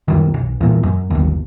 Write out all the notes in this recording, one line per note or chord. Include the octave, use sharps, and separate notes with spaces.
C2 F#2 D#3
B1
E2 A#2
F#2
G1 D#2